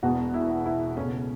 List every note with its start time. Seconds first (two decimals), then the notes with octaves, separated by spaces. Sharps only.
0.03 E1 E2 B2 F#4
0.34 E4
0.66 E4
0.97 C#2 B2 A3 C#4